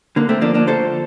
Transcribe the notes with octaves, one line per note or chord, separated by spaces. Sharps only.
D3 A#3
A3 C4
F3 A#3 D4
A#3 D4
D2 A4 C5